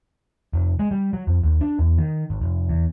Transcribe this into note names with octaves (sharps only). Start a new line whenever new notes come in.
F1
G#3
G3
F#3
F2
D#2
D4
E2
D#3
G#1
F1
E2